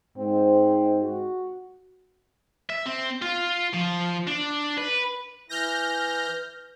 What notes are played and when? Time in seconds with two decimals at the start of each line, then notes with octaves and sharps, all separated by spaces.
0.18 G#2 C4
1.02 F#4
2.70 E5
2.86 C4
3.22 F4
3.74 F3
4.27 D4
4.78 B4
5.49 E3 F6 G6 A#6